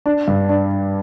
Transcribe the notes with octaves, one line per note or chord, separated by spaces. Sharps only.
D4
G2
D4